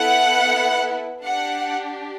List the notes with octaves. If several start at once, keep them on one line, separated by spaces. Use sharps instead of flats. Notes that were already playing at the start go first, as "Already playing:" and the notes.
Already playing: B3 E4 A4 F#5
D4 G4 F#5